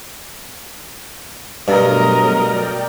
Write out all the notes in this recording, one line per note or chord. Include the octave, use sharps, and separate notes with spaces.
G2 B2 F#3 A3 A#4 D#5
D5 G5